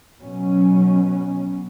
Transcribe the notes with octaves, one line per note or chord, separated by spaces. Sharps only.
B2 F#3 C#4